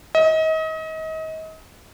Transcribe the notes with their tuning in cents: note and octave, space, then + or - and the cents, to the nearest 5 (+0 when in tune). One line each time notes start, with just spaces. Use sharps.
D#5 +35